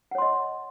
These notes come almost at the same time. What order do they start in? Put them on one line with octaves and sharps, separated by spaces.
F#5 C#5 C6 D#5